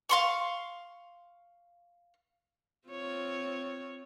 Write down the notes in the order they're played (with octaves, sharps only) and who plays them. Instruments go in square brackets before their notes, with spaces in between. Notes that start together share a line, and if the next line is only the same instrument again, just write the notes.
[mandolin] F5 C6 C#6
[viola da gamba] C4 F4 C#5